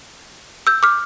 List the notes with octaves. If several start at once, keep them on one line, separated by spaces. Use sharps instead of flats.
E6 G6
D6 F6